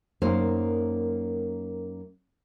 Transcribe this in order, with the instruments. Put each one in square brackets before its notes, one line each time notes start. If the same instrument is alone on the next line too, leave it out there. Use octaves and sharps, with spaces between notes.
[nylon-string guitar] F#2 A#3 D#4 C5